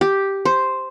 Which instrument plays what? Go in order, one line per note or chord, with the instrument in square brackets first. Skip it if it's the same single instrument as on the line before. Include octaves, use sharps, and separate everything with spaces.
[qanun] G4
C5